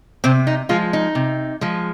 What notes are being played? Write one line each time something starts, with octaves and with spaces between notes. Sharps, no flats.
C3 C4
D#4
F3 G#3 F4
D#4
C3
F3 G#3